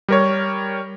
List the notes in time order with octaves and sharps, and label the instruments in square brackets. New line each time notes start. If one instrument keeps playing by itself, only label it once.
[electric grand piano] G3 A#4 C#5